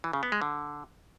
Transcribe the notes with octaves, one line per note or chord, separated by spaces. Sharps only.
E3
C#3
B3
G#3
D3